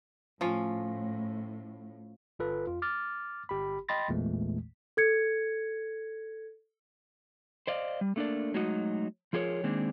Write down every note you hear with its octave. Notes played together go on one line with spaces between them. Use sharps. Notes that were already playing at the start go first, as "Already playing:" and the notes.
A2 F3 C#4 F4
G1 F4 A4 B4
F2 F4
D6 F6 A6
G1 G4 B5
D#5 G5 B5 C6 A6 A#6
A1 E2 A#2 E3 G#3 A3
A4 G#6 C#7
C5 D5 D#5 F5
G3
A3 A#3 D4 G#4 A#4 D5
F#3 G#3 A3 D#4 F#4 D#5
F3 F4 G#4 A#4 C#5
D#3 G#3 A#3 C4 D4